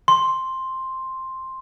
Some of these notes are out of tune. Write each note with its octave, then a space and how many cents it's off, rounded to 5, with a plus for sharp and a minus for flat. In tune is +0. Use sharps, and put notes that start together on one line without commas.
C6 +5